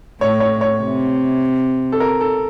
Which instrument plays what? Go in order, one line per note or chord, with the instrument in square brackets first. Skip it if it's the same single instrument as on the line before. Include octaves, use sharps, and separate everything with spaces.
[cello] A2 [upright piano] C#5
[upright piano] C#5
C#5
[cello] C3
[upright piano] A4
A#4
A4